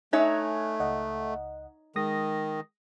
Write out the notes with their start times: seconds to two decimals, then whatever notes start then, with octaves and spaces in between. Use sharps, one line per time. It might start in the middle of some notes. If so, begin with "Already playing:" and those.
0.13 A3 D#4 C#5 E5 G#5 F#6 G#6
0.80 C#2 D#5 F#5
1.96 D#3 G#3 D#6 A#6